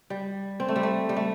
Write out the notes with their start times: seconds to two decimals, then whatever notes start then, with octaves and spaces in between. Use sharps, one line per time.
0.10 G3
0.60 C4
0.68 A3
0.76 G3
0.83 A3
1.09 G3
1.17 A3